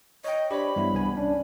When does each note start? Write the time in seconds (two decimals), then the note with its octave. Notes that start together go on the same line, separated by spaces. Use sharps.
0.24 C#5 D#5 G5
0.51 D4 G4 C5 C#5 B5
0.76 G2 E3 B3 E4
0.94 C2 B3 G#5
1.17 C#4 D4